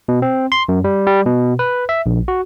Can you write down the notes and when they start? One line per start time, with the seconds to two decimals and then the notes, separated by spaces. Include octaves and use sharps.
0.08 B2
0.22 C4
0.52 C6
0.69 F#2
0.84 G3
1.07 G3
1.26 B2
1.59 B4
1.89 E5
2.06 A#1
2.28 F#4